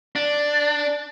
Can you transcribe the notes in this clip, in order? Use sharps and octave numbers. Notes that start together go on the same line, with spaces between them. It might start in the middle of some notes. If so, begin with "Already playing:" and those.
D4